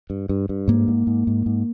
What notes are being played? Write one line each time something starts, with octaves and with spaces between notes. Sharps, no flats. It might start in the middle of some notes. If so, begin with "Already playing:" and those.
G2
G2
G2
G#2 A#3
G#2
G#2
G#2
G#2